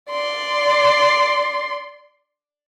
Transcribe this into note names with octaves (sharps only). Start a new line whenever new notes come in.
D5 C6